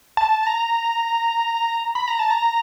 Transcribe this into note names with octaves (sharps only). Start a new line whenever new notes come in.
A5
A5
A#5
B5
A#5
A5
A#5